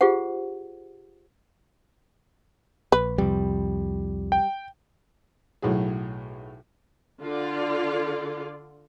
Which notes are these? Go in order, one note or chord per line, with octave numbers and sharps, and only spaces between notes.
F4 G4 G#4 C5 F#5
A#1 B4
C2 F2 G3
G5
B1 A2 F#3 F#4 G#4
D3 F4 A4 D5